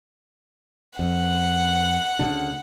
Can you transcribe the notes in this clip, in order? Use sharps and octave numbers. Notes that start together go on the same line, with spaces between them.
F2 F#5
D2 C#3 D4